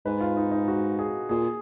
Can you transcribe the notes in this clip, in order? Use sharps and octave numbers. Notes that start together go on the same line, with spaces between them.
G#2 B4
F4
D#4
D#4
F#4
G#4
A#2 G#4